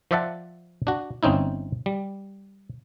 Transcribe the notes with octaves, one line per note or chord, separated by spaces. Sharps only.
F3 C5 D5 E5 F#5 A5
D4 F#4
G1 C4 C#4 D#4 E4
G3